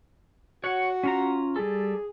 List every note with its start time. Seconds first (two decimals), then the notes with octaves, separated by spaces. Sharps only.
0.64 F#4 C#5 F#5
1.04 C#4 F4 A#5
1.56 G3 G#4 A4